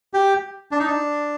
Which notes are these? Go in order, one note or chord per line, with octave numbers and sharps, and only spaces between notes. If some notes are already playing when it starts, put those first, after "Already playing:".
G4
D4
D#4
D4